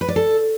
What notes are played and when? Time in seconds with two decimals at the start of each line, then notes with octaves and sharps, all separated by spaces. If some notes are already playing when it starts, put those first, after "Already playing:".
0.01 B4
0.08 D5
0.16 A4